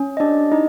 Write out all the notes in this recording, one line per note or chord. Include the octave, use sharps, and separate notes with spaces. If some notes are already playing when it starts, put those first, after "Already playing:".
Already playing: C#4
D#5
D4 G4 D5
D#4 E4 D#5